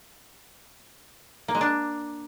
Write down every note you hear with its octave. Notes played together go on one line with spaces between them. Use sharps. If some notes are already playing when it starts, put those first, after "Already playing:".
A#3
G#3
D4